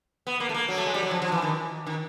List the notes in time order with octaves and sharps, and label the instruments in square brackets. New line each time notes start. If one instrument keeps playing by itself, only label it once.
[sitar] B3
A#3
A3
A#3
F#3
A3
G#3
G3
F#3
F3
F3
E3
D#3
D#3